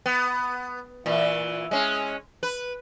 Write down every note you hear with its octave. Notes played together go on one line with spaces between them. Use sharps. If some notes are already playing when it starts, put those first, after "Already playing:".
B3
A#2 E3
G#3 C#4
B4